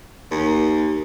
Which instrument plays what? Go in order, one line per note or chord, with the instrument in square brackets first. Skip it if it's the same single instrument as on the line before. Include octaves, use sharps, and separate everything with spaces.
[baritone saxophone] D#2